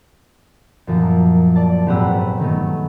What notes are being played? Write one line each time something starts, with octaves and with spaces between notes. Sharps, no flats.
F#2 A#2 F3
D5 A5
G#1 A#2 G4 B4 F#5 E6
G1
D#3 F#3 A3 B3